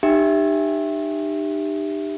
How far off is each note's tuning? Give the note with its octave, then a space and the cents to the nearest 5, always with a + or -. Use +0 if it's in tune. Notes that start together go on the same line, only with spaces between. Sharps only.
D#4 -35 G4 +10 E5 +0